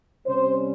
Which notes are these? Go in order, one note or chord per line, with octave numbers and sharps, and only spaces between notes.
C3 G3 C#4 C5